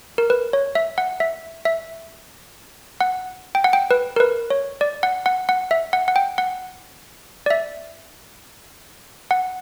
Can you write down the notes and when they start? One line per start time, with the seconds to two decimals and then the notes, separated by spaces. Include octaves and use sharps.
0.18 A#4
0.30 B4
0.53 C#5
0.75 E5
0.98 F#5
1.20 E5
1.65 E5
3.01 F#5
3.55 G5
3.64 F#5
3.73 G5
3.91 B4
4.16 A#4
4.20 B4
4.50 C#5
4.81 D5
5.03 F#5
5.26 F#5
5.49 F#5
5.71 E5
5.93 F#5
6.08 F#5
6.16 G5
6.38 F#5
7.46 D5
7.50 E5
9.31 F#5